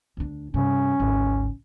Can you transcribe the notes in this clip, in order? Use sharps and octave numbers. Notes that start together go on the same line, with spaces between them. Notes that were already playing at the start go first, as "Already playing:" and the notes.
D2 D4
G2 C3 C#4
G#1 D2